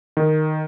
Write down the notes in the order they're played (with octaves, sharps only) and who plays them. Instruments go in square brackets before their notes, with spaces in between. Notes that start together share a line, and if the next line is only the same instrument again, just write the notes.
[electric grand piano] D#3